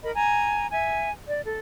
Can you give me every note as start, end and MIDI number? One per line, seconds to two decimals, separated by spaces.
0.03 0.11 70
0.03 0.11 75
0.03 0.11 83
0.15 0.67 80
0.15 0.67 82
0.71 1.10 76
0.71 1.10 80
1.26 1.40 74
1.44 1.59 69